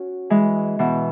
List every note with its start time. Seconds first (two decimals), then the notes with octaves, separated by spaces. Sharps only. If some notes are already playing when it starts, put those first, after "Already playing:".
Already playing: C#4 F#4
0.30 E3 G#3
0.79 B2 E3